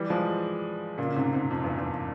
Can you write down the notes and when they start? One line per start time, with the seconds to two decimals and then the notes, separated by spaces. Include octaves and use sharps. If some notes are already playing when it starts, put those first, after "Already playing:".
Already playing: E3 G3
0.10 F3 G#3
0.98 A#2 C#3
1.09 C#3
1.16 G#2 C3
1.33 G#2 C3
1.51 F2
1.64 E2 G2
1.77 E2 G2